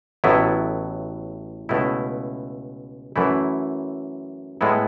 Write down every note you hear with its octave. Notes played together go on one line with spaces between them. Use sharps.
A1 A2 F#3 B3 E4
C#2 B2 A3 E4
F#2 E3 A3 E4
A2 G#3 B3 E4